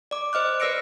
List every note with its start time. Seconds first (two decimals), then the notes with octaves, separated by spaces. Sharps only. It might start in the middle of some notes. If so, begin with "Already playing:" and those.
0.11 D5 D6
0.33 C5 D#5 F6 F#6
0.60 B4 D5 E6 A#6 C#7 D7